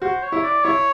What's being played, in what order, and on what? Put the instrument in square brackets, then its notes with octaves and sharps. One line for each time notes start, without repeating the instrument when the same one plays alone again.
[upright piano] F#4 [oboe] C5
[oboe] C#5
[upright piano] E4
[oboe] D5
[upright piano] E4 [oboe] C#5